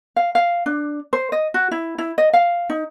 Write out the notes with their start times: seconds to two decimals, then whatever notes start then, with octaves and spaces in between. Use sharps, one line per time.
0.16 F5
0.35 F5
0.66 D4
1.13 C5
1.32 D#5
1.54 F#4
1.71 E4
1.98 E4
2.18 D#5
2.33 F5
2.70 D#4